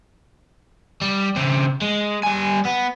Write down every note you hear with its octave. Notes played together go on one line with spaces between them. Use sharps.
G3
C#3 C4
G#3
G3 G#5
B3